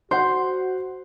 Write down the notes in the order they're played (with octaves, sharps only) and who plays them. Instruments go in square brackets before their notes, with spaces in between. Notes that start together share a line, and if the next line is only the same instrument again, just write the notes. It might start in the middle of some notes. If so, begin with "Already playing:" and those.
[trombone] F#4 [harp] C5 [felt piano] F#5 C6